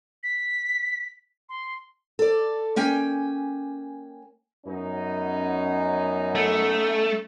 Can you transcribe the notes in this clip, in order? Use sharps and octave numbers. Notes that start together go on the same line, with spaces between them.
B6
C6
A4 D5
A#3 C#4 G5 G#5
F#2 B3 C#4 D#4
A3